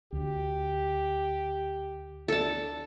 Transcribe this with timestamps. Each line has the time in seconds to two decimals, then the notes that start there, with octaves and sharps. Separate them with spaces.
0.13 D2 G4
2.28 D4 A4 A5